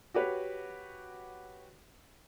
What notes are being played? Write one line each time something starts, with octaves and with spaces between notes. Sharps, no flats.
F#4 G4 B4 C#5